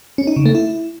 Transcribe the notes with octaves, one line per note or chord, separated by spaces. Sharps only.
C#4
D#4
C#3
A3
E4